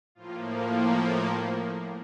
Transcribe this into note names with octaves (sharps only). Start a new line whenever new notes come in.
A2 F3 A#3 F4
F4